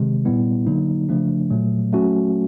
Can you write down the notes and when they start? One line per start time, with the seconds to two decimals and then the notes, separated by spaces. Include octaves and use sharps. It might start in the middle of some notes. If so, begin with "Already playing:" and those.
Already playing: C3 D#3 G#3
0.25 A#2 G3 B3 E4
0.67 D3 F#3 A#3 D#4
1.09 C#3 F3 A3 D4
1.50 A#2 F#3 A3
1.93 F#3 A3 C#4 F#4